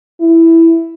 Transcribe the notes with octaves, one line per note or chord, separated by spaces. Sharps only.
E4